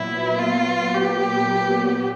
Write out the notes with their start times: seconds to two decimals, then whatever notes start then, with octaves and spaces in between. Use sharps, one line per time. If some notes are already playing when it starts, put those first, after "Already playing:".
Already playing: A#2 F#3 B3 E4
0.39 F4
0.94 G4